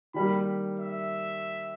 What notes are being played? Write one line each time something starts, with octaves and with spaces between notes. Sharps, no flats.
D#3 G3 A#3 B5
E5